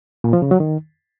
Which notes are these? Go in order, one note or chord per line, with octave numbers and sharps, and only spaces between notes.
A#2
F3
C#3
F#3
D#3